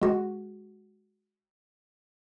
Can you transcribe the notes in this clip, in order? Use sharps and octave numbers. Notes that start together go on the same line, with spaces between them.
G#3 F#4